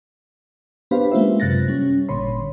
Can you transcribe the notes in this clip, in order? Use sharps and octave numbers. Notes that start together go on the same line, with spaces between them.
B3 D4 G4 B4 C5 F5
G#3 A#3 C#4 F4 C5 E5
F#2 C3 F#6 A6 A#6
G3 C#4
G#1 A#2 D3 C#5 B5 C6